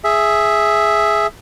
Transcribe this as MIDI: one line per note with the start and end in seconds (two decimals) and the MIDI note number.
0.04 1.27 68
0.04 1.27 76